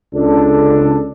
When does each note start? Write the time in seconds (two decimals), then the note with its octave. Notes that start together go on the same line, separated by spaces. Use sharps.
0.14 C#2 C#3 D4 A4